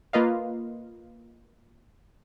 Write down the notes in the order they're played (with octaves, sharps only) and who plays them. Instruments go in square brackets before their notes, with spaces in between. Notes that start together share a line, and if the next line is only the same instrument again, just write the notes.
[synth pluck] A#3 F4 B4 D#5 F5